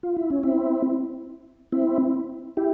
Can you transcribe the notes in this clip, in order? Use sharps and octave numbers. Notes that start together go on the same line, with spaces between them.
F4
E4
C#4
C4 E4
C4 E4
E4 G4